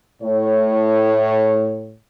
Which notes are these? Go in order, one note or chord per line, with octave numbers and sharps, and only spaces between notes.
A2 C#5